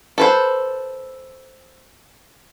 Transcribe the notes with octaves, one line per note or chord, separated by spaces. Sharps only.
A4 B4 C5